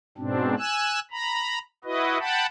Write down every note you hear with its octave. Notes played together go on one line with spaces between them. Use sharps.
G#2 B2 C4 D4
G#5 E6 F#6
A#5 B5
E4 F#4 B4 D#5
F#5 G5 A5 B5